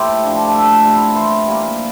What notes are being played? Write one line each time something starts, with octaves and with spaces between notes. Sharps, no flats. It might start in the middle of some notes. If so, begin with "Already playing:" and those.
Already playing: A2 E4 G4 C5
F3 A3 D4
A2 A4
G3 C4 E4
E3 C5
G3 A#3